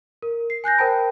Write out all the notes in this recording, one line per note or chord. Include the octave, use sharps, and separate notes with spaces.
A#4
C7
G#5 F#6 G6 A#6
A#4 C5 G5 A5 B5